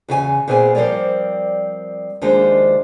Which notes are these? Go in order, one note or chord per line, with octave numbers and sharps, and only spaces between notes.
E2 C#3 F4 G#5
A#2 B3 C4 G#4 D5 G#5
F3 G3 C4 A#4 C#5 D5
D#2 D#3 F3 G#3 D4 C5